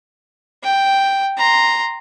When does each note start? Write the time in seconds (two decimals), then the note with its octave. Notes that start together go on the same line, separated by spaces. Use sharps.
0.63 G5
1.37 A#5 C6